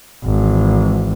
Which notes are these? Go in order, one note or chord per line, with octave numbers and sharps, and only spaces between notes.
G#1 E3